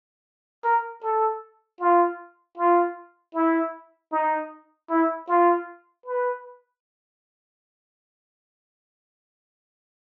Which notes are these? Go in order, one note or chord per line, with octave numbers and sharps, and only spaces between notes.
A#4
A4
F4
F4
E4
D#4
E4
F4
B4